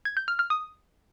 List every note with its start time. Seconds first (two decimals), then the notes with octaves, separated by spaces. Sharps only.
0.05 G#6
0.17 G6
0.28 F6
0.39 F6
0.50 D#6